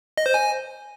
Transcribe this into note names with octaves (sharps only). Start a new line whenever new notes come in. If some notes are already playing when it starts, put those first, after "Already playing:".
D#5
C5
G#5